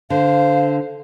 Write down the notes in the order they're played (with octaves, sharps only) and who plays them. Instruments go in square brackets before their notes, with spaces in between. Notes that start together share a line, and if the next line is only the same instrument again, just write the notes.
[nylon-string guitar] D3 [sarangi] C5 [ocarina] F5